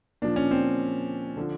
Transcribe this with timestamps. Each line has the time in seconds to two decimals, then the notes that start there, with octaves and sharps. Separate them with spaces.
0.22 A#2 F3 D4
0.36 C#4
0.51 C4
1.37 D3 F3